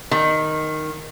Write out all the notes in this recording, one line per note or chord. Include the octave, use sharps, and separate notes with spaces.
D#3